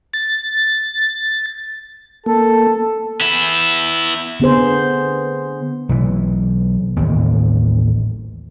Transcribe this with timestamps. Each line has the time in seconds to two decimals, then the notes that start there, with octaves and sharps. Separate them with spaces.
0.14 A6
2.26 A#3 A4
3.21 B3 E4
4.40 D3 B3 G#4 C5
5.89 B1 E3
6.96 A1 D#2